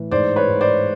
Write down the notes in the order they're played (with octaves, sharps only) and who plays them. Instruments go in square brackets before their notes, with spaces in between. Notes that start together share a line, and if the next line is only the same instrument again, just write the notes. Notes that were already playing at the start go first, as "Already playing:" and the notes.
Already playing: [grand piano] A2 E3
G#2 C5 D5
B4 C#5
G#2
C5 D5